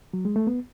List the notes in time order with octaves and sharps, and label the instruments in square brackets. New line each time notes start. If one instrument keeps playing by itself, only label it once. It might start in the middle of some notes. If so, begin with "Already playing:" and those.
[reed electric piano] F#3
G#3
A3
B3